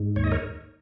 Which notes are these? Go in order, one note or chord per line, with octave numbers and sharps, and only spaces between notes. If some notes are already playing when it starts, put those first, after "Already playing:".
Already playing: G#2
D#2 C#5
D#5
A#4 C#5